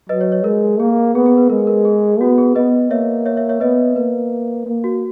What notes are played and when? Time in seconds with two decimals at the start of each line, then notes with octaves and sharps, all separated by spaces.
0.09 F#3 B4 D#5
0.21 C#5
0.32 C#5
0.44 G#3 A#4
0.80 A#3 G#4
1.15 B3 G#4
1.26 G#4
1.38 B4
1.50 G#3 A#4
1.67 A#4
1.85 G#4
2.20 B3 F#4
2.38 G#4
2.55 B3 B4 D#5
2.90 A#3 C#5 E5
3.26 C#5 E5
3.37 C#5 E5
3.49 C#5 E5
3.60 B3 B4 D#5
3.96 A#3 B4
4.66 A#3
4.84 F#4